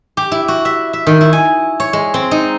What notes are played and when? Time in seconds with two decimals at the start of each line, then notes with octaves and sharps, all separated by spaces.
0.17 G4
0.32 E4
0.48 F#4
0.65 E5
0.93 E5
1.07 D#3
1.21 E4
1.33 G#5
1.80 C#5
1.93 G#3
2.14 C4
2.31 D#4